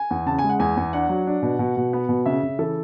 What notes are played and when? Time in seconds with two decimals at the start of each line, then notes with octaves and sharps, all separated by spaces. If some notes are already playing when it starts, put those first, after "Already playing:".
Already playing: G#5
0.11 E2
0.26 C#3 A5
0.39 G#5
0.44 G#3
0.49 F#5
0.59 E2 G#5
0.77 E2
0.93 D4 F#5
1.09 F#3
1.27 D4
1.42 B2
1.59 B2
1.77 B2
1.93 B3
2.09 B2
2.26 C#3 E5
2.43 C#3
2.59 E3 A4